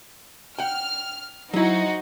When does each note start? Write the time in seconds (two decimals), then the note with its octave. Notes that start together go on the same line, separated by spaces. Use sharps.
0.59 F#5 G5 F6
1.54 F#3 D#4 E4 F#4 C5